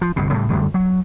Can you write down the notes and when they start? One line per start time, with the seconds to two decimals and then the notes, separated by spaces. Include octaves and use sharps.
0.01 F3
0.16 G1 C2 B2
0.32 A2 C#3 G3
0.50 F#2 D3 G3 A3
0.74 F#3